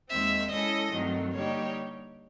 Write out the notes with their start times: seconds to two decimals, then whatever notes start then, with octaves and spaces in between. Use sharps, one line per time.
0.10 D#2 D#3 G#3 C4 E5
0.50 G#3 C#4 E4 A4 D#5
0.92 G2 D#3 F#3 A3 C4
1.33 D3 G3 A#3 D#4 G4 C#5